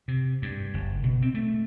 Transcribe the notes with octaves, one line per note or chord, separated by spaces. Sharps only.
C3
G2
F#1
B2
C4
A3